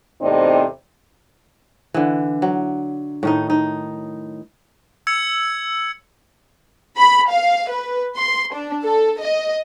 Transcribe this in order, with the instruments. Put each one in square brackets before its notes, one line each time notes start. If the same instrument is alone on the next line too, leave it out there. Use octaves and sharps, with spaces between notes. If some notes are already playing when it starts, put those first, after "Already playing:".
[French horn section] E2 A2 C3 C4 D#4 D5
[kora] D3 E3
F#3
A2 D#3 D#4
D#4
[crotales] E6 G#6 C#7
[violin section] B5
F5
B4
C6
D4
A4
D#5